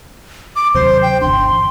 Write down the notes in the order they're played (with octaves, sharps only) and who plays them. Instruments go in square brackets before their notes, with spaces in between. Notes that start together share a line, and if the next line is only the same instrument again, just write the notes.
[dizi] D6
[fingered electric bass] D#2 C3 F#3 [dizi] C5
[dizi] G5
[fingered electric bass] G1 E2 D4 [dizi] C6